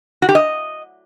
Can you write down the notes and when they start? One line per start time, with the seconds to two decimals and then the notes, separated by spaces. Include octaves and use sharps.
0.22 F#4
0.29 G4
0.35 D#5